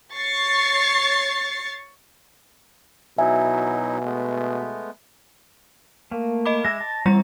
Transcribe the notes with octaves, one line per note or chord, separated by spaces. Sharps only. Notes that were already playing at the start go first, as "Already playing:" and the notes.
C#5 C#6 A6 C7
B2 F#3 D#4 E4 E5 G#5
G#3 A3 B3
A3 A#3
D#5 B5 D6
G#3 E5 A#6
A5
E3 G3 C4 C#5 A#5